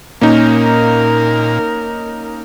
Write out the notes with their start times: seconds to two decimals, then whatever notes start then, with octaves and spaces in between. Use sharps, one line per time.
0.21 A#2 A#3 C#4 D#4 A#4